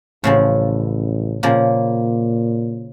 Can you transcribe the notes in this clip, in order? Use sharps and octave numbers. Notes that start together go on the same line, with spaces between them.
A1 A2 C#3 F3
A#2 C#3 F3 A#3